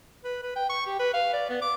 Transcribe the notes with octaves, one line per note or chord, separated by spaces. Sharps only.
B4
B4
G5
C#6
G4
B4
F5
D5
B3
D6